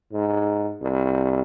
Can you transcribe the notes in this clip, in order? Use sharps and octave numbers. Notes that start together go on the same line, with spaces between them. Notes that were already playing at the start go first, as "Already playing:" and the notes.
G#2
C2